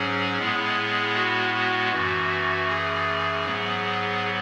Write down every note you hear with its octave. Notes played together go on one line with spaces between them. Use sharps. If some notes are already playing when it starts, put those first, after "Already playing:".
Already playing: G#2 F#3 C#4 G#4
A2 G#3 B3
F#4
F#4
F#2 E3 A3 F#4
G#4
G#2 F#3 B3